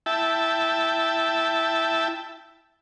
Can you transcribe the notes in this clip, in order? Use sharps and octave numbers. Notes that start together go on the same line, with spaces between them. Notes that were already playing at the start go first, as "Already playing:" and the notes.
E4 E5 G5 A5